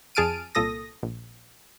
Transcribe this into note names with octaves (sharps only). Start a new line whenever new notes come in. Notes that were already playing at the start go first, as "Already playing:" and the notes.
F2 G#4 A5 F6 D7 D#7
C2 A#2 A4 D#6 A#6
A#1